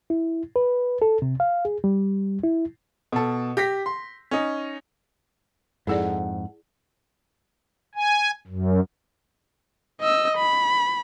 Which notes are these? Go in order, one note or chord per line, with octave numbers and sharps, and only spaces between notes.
E4
B4
A4
C3
F5
G#4
G3
E4
B2 A4
G4 A#6 B6
C6
C#4 D#4
F2 G#2 E4 G#4 A4 D5 F#5
G#5
F#2
D#5 E6
B5